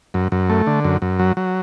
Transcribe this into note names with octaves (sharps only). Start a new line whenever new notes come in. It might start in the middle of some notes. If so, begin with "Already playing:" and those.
F#2
F#2
A3
D3
F#2
F#2
F#3
F#3